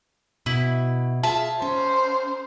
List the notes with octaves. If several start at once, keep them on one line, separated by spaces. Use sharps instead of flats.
B2 E4
F4 G#4 E5 A5
C#4 C5